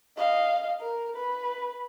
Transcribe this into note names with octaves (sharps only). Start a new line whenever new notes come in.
D#5 F5
A#4
B4